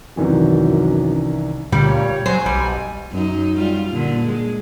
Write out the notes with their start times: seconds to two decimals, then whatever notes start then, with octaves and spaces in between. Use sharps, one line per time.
0.17 C2 F#2 D#3 E3
1.72 D2 A#2 G3
1.86 C#5
2.26 F#3 C5 G#5
2.46 B1 G3
3.11 F#2 D#4
3.56 G3 F4
3.90 A#2 D3
4.26 G#3